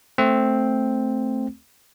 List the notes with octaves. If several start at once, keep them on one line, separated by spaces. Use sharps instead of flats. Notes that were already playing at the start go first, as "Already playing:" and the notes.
A3 C4